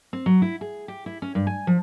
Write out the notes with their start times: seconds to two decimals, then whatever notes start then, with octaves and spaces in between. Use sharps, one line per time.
0.13 C4
0.26 F#3
0.42 E4
0.61 G#4
0.88 G4
1.06 E4
1.22 C#4
1.35 G2
1.47 G#5
1.67 F3